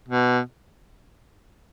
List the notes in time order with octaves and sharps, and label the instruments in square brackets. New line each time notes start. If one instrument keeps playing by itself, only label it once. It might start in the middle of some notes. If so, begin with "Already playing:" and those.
[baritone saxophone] B2